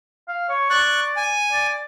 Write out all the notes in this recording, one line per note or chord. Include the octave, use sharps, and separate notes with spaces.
F5
C#5
D5 C#6 F#6
G#5
D5